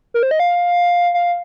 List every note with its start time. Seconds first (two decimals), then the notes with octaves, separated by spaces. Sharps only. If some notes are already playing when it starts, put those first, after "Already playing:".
0.14 A#4
0.23 C5
0.31 D#5
0.40 F5
1.14 F5